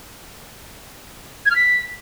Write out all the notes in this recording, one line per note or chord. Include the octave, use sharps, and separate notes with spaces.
G#6
F6
B6